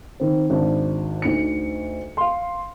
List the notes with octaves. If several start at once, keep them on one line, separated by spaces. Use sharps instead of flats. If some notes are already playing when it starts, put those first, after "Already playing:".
D#3 C4
G#1 D4
D2 D#4 C#7
F5 C6